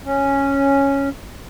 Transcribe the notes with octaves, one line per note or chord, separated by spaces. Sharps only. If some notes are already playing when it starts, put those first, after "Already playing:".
C#4